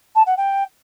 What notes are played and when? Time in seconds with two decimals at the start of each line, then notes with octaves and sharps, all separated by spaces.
0.15 A5
0.26 F#5
0.37 G5